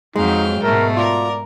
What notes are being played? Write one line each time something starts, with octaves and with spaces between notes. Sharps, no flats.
F2 F#3 G#3 D#4 F5 G5
G#2 B2 A3 A#4
F4 A#4 D5